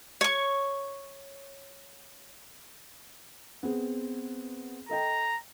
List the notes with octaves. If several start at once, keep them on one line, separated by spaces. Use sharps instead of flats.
C#5 C#6
B3 C4 G#4
A4 D#5 G5 A#5